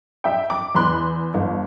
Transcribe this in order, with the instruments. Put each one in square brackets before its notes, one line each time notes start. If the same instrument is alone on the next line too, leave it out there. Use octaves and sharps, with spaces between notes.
[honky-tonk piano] E5 G5
D6
E2 B5 C6 F#6
G1